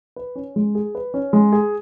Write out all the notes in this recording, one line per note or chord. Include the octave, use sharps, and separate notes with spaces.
B4
C#4
G#3
G#4
B4
C#4
G#3
G#4